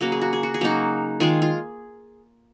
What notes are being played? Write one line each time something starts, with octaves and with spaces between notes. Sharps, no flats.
C#3 F#3 A#3 F#4
G#4
F#4
G#4
F#4
G#4
C#3 F#3 A#3 D#4 F#4
D#3 G#3 F4 G#4
F4